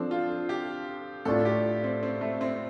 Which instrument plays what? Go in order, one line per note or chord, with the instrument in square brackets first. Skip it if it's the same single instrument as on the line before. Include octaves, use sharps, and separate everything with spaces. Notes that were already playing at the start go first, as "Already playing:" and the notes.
Already playing: [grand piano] F3 C4 A4 C5 [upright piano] D4
[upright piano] F4
G4
[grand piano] A2 A3 D4 F4 [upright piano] A4
[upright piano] G4
C4
C4
A3
C4